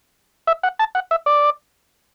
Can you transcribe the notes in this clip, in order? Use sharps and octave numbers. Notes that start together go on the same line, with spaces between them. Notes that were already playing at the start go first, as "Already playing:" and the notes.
E5
F#5
A5
F#5
E5
D5